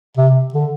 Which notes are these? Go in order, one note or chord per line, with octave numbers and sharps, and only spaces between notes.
C3
D3